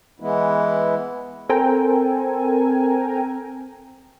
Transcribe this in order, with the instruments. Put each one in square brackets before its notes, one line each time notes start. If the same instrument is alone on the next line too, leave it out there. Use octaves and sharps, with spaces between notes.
[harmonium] E3 G#3 B3 E4
[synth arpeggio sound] C4 A4 A#4 G5 G#5 A#5